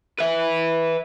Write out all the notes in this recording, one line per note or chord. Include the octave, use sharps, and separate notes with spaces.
B4 E5